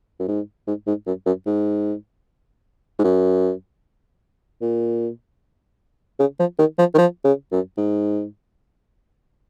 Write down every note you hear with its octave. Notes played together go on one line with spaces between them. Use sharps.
F#2
G#2
G#2
G#2
F#2
F#2
G#2
G#2
F#2
A#2
C#3
F3
D#3
F3
D#3
F3
C#3
F#2
G#2